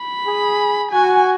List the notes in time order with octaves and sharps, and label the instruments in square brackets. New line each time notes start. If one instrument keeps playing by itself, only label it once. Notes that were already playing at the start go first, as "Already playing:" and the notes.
Already playing: [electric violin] B5
[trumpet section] G#4
[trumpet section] F#4 [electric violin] G#5